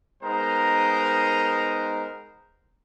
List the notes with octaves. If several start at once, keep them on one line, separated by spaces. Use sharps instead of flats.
G#3 B3 D#4 A#4 C5 A#5